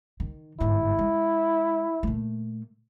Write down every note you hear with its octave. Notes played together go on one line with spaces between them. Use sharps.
D#3
G1 G#2 E4
G#3
A#2 A3